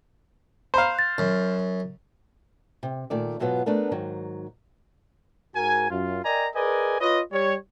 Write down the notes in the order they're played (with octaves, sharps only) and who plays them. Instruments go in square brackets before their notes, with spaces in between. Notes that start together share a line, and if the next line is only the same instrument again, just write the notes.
[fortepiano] C5 F5 [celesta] A#5 B5
[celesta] F#6 A6
[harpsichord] F#2
[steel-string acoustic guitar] C3
A#2 D#3 A3 D5
G#2 B2 F#3 B3 F4
A3 B3 D4 A#4
G#2 D#3 F#3
[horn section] G#2 F#4 A#4 G#5
F#2 F4
A#4 D5 D#5 G5 G#5 A#5
G#4 A#4 B4 D5 D#5 G#5
F4 B4 C#5 D#5
G3 C#5